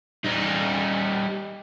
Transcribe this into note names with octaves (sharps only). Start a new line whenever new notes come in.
G3 D#4